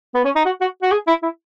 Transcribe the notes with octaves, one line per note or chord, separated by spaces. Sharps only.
B3
C#4
D#4
F#4
F#4
F#4
G#4
E4
E4